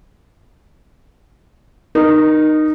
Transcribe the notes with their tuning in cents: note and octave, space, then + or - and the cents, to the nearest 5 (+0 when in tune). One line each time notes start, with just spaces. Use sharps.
D#4 -15 A#4 +15